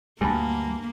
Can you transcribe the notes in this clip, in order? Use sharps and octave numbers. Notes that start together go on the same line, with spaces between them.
D2 G2 D3 G3 A#3 G#5 A5 B5